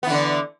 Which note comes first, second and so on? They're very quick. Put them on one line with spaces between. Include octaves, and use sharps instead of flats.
B3 E3 D3